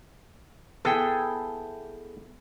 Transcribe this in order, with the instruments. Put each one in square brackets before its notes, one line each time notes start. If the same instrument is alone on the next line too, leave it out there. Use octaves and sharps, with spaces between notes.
[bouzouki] B3 G5 [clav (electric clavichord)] E4 G#4 A4